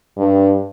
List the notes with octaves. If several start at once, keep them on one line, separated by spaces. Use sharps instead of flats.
G2